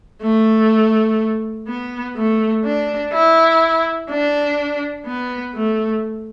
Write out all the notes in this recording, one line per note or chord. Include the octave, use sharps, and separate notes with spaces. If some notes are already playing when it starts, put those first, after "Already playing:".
A3
B3
A3
D4
E4
D4
B3
A3